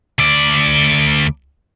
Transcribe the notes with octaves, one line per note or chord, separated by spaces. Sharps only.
D2 D5